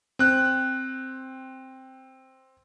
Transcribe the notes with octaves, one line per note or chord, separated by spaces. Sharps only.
C4 F#6